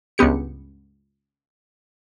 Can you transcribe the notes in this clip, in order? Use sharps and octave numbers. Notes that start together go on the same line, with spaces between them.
C#2 G2 B3 G4 C#7